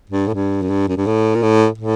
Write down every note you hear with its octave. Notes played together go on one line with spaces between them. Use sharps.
G2
A2
G2
F#2
G2
F#2
G2
A2
A#2
A2
A2